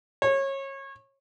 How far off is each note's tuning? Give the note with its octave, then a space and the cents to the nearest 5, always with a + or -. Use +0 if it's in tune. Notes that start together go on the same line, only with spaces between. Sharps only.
C#5 -25